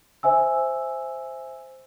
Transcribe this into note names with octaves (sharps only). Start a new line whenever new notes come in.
C5 E5 G#5 E6